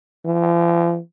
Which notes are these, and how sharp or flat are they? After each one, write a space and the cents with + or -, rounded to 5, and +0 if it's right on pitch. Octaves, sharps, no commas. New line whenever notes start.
F3 -45